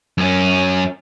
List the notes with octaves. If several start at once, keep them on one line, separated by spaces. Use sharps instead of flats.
F#2 C#4